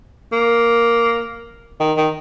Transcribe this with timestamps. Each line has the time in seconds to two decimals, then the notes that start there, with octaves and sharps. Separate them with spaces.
0.32 A#3
1.80 D#3
1.97 D#3